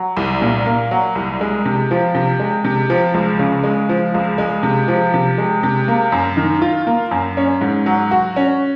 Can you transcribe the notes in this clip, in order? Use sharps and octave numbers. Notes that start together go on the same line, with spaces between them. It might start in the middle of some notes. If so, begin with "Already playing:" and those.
Already playing: F#3
C2
A#2
A#3
F#3
C2
G#3
C3
F3
C3
G#3
C3
F3
C#2
C#3
G#3
F3
C#2
G#3
C3
F3
C3
G#3
C3
A#3
F#2
D#3
F4
A#3
F#2
C#4
G#2
F#3
F#4
C#4